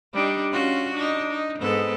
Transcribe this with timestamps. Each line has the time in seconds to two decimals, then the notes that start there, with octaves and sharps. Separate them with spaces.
0.14 G3 D4 D#4
0.52 C#4 F4 F#4
0.95 D4 D#4
1.31 D#4
1.59 G#2 B3 A4